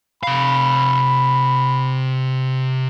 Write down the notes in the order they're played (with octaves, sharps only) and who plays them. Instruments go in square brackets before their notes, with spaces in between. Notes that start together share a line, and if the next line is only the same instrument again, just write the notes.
[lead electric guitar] C3 F5 [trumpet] B5